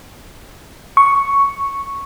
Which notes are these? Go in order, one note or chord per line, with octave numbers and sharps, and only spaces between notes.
C#6